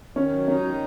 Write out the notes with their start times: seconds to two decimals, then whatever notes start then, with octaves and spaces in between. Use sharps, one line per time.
0.16 D#3 C#4
0.31 F#3
0.48 C#4 D#4
0.64 D#3